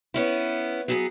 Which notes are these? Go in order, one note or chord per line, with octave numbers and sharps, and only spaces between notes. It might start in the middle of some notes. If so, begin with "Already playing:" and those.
B3 C#4 E4
F#3 B3 G#4